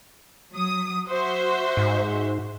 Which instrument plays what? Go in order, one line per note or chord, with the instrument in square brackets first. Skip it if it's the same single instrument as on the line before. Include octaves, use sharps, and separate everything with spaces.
[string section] F#3 D#6
F#4 C5 E5
[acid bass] G#2